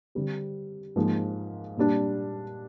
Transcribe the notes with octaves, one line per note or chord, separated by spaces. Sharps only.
D3 G3 C4 G4
G#2 F3 A#3 D#4
A#2 G3 D4